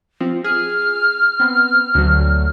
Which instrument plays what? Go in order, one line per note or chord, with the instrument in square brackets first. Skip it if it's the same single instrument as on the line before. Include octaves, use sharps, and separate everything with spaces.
[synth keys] F3 C4
[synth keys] G#4 [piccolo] F6
[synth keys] B3 C4
D2 F#3